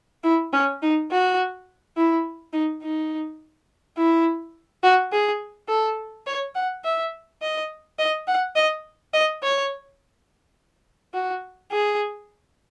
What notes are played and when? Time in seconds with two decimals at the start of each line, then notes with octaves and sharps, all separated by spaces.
0.24 E4
0.53 C#4
0.82 D#4
1.11 F#4
1.97 E4
2.53 D#4
2.83 D#4
3.97 E4
4.83 F#4
5.12 G#4
5.69 A4
6.27 C#5
6.55 F#5
6.84 E5
7.42 D#5
7.99 D#5
8.27 F#5
8.56 D#5
9.13 D#5
9.43 C#5
11.14 F#4
11.71 G#4